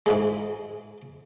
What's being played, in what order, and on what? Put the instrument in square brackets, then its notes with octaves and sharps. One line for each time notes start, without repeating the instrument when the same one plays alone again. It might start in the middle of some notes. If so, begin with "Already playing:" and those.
[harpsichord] G#2 E3 G#3